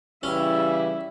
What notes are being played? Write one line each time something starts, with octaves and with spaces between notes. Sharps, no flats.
C#3 E3 G3 C#4 E4